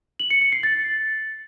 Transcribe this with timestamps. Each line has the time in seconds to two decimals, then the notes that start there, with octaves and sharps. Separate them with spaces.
0.20 F#7
0.30 C#7
0.41 C#7
0.52 C7
0.63 A6